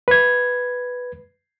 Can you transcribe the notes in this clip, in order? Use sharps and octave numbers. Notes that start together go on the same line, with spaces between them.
B4 G#6